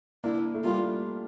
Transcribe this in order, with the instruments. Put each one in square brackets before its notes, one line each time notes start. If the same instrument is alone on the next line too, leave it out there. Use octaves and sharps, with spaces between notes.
[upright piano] A#3 D4 [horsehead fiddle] E4
[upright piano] A3
[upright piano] G3 A#3 [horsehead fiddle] F4